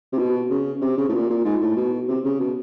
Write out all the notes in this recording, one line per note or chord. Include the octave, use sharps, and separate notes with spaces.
C3
B2
C#3
C3
C#3
A2
A#2
A#2
G#2
A2
B2
C3
C#3
B2